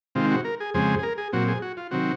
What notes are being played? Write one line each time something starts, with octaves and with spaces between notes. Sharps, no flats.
C3 D#3 G#3 C4 F4
F#4
A#4
G#4
F2 C#3 G#3 C4 G#4
G#4
A#4
G#4
A#2 F#3 C4 F#4
G#4
F#4
F4
C3 D#3 F#3 C4 F#4